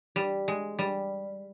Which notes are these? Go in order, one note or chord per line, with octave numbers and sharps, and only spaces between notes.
G3
G#3
G3